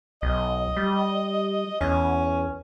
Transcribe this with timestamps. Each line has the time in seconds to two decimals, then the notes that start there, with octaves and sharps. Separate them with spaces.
0.22 B1 D#5
0.76 G3
1.81 E2 C#4